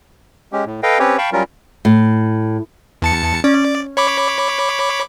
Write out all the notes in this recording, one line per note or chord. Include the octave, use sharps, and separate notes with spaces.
G#3 C#4 G4
A2
A4 B4 D#5 F5 G5
C4 C#4 G4 B4 C#5
F5 G5 A5 B5 C#6
F#3 G3 C#4 F4 A#4
A2
E2 A5 C#7
C#4 D5
C#5 B5 D6